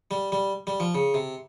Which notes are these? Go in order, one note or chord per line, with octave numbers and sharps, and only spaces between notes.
G3
G3
G3
F3
C#3
C3